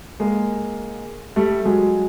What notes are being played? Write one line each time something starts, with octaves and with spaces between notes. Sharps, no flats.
G#3 A#3
G3 A3
F#3 G#3